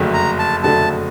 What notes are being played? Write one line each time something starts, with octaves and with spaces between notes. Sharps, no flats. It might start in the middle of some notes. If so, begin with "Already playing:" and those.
Already playing: F#1 F2 D3 F#3 A3
A#5
A5
F#1 F2 D3 F#3 A3 A5